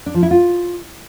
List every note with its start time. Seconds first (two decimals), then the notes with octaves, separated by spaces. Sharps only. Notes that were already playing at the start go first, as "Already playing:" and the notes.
0.06 D4
0.14 F3
0.23 E4
0.31 F4